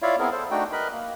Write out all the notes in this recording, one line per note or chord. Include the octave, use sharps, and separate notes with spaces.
E4 F4 C#5 D5 E5 F5
B3 C4 E4 G#4 A#4
A4 C5
A3 D4 D#4 F#4 G5
A#4 B4 D#5 B5
A#3